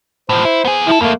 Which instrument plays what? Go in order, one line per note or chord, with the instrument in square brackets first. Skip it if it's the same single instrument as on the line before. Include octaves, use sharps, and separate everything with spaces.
[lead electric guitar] A2 F3 [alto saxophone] C5
[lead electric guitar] E4
B3 G#4
[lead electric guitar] F3 A4 [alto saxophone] E4
[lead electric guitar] F2 A3 [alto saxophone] A#3